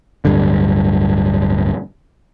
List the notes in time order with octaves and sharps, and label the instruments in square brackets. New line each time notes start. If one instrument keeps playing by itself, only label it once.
[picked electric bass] D1 G2 D3